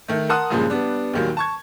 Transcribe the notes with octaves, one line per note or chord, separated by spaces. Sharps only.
D#3 A3
A#4 F#5 A5 C6 D#6 F#6
G2 A#2 C#3 F3 G#3
G3 B3 D4
D#2 A#2 D#3 F#3 G3
A5 C#6 G#6